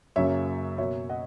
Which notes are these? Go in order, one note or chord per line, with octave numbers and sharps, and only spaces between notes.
F#2 C#3 F#3 A#3 C#5 E5
B2 F#3 A#3 C#5 E5
D#5 F#5